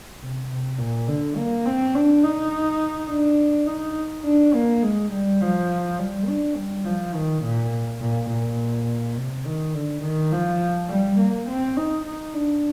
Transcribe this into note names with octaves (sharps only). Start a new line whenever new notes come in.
C3
C3
A#2
D3
A#3
C4
D4
D#4
D4
D#4
D4
A#3
G#3
G3
F3
G3
D4
G3
F3
D#3
A#2
A#2
A#2
C3
D#3
D3
D#3
F3
G3
A#3
C4
D#4
D#4
D4